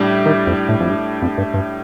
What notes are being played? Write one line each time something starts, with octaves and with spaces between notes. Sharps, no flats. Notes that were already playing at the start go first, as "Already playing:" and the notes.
Already playing: A2 G3 D4 G4
D#3
F2
A2
F2
G2
F2
G2
G2